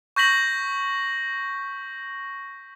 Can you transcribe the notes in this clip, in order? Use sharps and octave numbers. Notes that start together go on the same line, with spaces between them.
C#6 G6 A#6 B6 F#7